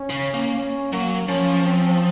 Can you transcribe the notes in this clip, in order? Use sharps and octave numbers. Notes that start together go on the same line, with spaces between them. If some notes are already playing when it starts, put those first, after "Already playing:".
Already playing: C#4
C#3
A#3
C#4
F#3 A#3
F3 C#4
C4